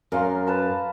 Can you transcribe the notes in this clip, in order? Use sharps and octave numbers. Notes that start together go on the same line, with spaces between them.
F#2 A#4 F5 C6
B4 A5 A#5